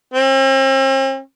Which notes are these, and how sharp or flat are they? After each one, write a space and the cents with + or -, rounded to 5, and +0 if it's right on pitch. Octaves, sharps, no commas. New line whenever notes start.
C4 +45